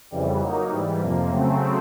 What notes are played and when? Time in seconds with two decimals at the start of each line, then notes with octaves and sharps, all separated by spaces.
0.11 F2 C#3 E3 G3
0.40 F#3 A#3 D#4
0.70 G#2 E3 G3
1.00 F2 C3 F3 A#3
1.30 C#3 F#3 A3 C4